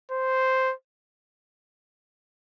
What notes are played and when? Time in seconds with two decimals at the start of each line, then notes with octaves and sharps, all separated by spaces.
0.12 C5